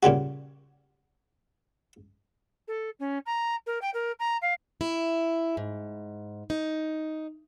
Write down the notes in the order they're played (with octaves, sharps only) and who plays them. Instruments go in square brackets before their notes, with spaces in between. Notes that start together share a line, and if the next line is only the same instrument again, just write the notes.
[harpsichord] A#2 C#3 G3 F#4
[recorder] A4
C#4
A#5
A#4
G5
A#4
A#5
F5
[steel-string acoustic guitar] E4
G#2
D#4